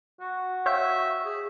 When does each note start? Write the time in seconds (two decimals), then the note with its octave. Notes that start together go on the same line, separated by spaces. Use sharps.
0.20 F#4
0.66 C#5 E5 F5 G5
1.25 G#4